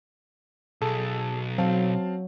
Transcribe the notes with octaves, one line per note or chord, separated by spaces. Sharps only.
B1 G#4 A4 A5
F#3 C4 F5 A5